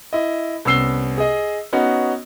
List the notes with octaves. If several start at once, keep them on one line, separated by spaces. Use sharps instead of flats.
E4 D#5
C2 B3 C#4 E6 C7 G7
G#4 D#5
B3 C#4 D#4 F#4